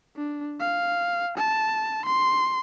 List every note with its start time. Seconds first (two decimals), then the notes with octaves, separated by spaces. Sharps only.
0.16 D4
0.59 F5
1.38 A5
2.05 C6